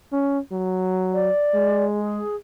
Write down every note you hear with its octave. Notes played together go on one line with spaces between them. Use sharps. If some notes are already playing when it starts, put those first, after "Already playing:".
C#4
F#3
D5
G#3
G#4